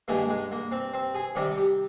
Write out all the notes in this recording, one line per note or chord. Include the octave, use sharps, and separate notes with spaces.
G2 D#3 G#3 A#3
G#3
A#3
C4
C4
G#4
C3 D#3 G3 G4
G4